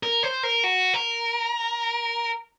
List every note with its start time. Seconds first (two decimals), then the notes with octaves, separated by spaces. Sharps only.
0.03 A#4
0.23 C5
0.43 A#4
0.64 F#4
0.94 A#4